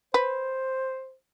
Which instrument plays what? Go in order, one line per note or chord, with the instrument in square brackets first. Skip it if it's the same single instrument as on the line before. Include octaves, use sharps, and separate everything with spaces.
[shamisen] B4 [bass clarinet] C5